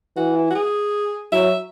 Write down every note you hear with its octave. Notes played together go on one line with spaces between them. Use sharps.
E3 F#4
E4
F#4
G#4
F#3 E5